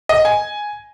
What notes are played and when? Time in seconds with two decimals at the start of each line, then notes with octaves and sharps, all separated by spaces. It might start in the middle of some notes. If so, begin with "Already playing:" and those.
0.09 D#5
0.25 G#5